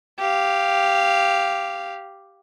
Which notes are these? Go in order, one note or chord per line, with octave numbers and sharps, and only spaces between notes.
G4 F5